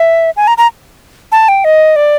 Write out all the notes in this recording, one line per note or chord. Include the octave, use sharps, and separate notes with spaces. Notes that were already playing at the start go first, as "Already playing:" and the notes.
Already playing: E5
G#5
A#5
A#5
A5
G5
D#5
D5